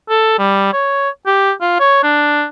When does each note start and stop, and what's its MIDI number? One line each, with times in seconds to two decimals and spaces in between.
0.09 0.35 69
0.39 0.73 55
0.73 1.09 73
1.26 1.52 67
1.61 1.75 65
1.80 2.01 73
2.03 2.45 62